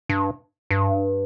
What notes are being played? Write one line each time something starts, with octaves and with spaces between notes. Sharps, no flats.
G2
G2